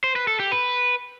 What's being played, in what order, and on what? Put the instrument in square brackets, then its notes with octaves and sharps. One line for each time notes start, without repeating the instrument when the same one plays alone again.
[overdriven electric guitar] C5
B4
A4
G4
B4